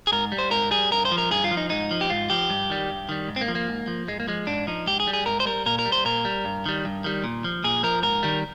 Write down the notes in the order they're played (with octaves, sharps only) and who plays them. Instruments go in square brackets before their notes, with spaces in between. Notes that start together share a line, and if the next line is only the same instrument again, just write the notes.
[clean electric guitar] G#4
G#2 A#4
G3
C5
G#2 A#4
G3 G#4
G2 A#4
C5
F3
A#4
G2 G#4
F4
F3
D#4
G#2 D#4
F3
G4
G#2 F4
F3 G4
G2
D#3 G3
G2
D#3 G3
G#2
C4
A#3
F3
A#3
G#2
F3
G#2 G#3
A#3
F3 G#3
G#2 D4
F3 D#4
G#2 G4
G#4
G3
G#4
G#2 A#4
C5
G3 A#4
A#2 A#4
A#4
G3
C5
A#2 A#4
G3
G2
D#3 G3
G2
D#3 G3
A#2
F3
A#2 G#4
F3 A#4
G#2 A#4
D#3 G3